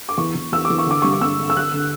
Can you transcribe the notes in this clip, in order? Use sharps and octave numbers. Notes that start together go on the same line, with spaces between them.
D6
E2 C#6
E2
E2 E6
D6
E2
C#6
D3 D6
G2 C#6
D6
G2 E6
D3
E6
D3 F#6
D3